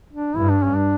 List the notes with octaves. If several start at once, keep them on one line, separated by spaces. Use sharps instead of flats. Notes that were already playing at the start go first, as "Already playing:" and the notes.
D4
G2 E4
D4
C#4
D4